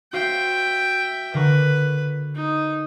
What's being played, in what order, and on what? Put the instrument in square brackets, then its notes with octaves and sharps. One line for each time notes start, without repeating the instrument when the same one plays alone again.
[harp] F#4 C5 F5 [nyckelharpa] E5 G5
[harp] D3 A#4 C#6 [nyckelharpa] B4
[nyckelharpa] D#4